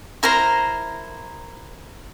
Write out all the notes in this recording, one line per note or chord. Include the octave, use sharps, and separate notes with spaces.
E4 A#4 C5 A#5